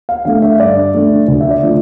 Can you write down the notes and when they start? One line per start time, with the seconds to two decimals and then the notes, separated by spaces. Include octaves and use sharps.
0.09 F5
0.25 D3 A3 F5
0.42 E5
0.60 G2 D5
0.94 D3 A3
1.28 D2
1.41 E5
1.51 D5
1.62 D3 F3 A3